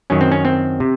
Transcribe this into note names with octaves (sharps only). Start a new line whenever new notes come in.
F#2 D#3 F#3 C#4
C4
C#4
C4
C3